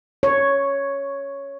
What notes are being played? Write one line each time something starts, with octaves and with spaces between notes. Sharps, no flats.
C#5